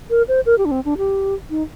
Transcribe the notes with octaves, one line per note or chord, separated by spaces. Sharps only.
A#4
C5
A#4
G4
D4
C4
D4
G4
D#4